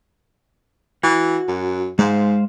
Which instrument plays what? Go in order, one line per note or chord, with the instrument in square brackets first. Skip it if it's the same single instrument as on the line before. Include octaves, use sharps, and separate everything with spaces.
[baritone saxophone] E3 [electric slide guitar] F#4
[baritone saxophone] F#2
[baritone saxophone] G#2 [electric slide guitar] G#3 C5 F5